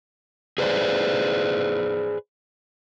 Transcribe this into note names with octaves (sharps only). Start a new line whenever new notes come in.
G#4 B4 C5 D5